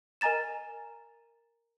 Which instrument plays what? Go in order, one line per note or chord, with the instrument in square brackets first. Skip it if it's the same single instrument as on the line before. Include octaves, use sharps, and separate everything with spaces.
[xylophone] A#4 D#5 G#5 A#5 A6 E7